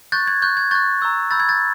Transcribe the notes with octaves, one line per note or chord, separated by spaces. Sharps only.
C#6 F#6 G6 A6
G#6
C#6 F#6 G6
G#6
C#6 F#6 G6 A6
A#5 C#6 E6 G6
B5 E6 G6 A6
G#6
G6 A6